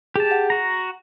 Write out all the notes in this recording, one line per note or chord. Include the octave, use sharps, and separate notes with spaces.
G4 G#4 A5
F#5
F#4 A#5